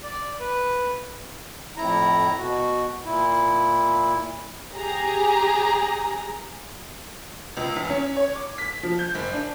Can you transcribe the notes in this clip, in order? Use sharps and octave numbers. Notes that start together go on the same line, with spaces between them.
D5
B4
F2 A2 E4 A#5
B2 F#4
A#2 E4
G4 G#4 A#5
C#2
E2
C#4
C#5
D6
B6
F3
G6
F#1
D4